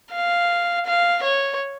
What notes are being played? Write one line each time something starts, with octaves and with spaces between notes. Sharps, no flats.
F5
F5
C#5